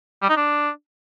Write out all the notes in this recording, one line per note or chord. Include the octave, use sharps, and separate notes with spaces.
G3
D#4
D4